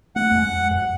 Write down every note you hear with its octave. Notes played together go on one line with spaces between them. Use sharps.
A3 F#5
F2 G#3
F#2